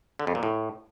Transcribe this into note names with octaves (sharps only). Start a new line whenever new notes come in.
D3
F2
A#2
A2